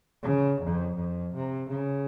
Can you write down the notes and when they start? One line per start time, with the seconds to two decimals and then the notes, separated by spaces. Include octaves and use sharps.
0.23 C#3
0.60 F2
0.96 F2
1.33 C3
1.69 C#3